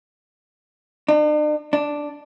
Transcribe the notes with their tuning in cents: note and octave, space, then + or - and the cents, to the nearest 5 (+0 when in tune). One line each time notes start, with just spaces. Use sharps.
D4 +45
D4 +0